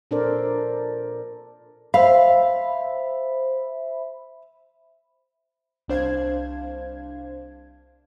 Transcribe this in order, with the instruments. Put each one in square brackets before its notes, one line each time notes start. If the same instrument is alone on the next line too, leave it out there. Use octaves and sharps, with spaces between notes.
[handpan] A#2 D4 A4 A#4 C5 D5
[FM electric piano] C5 E5 B5 [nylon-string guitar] F5
[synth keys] C2 D4 C5 F5 G#6